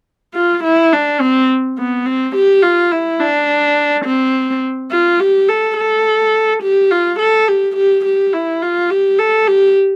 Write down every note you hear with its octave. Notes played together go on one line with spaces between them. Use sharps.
F4
E4
D4
C4
B3
C4
G4
F4
E4
D4
C4
F4
G4
A4
A4
G4
F4
A4
G4
G4
G4
E4
F4
G4
A4
G4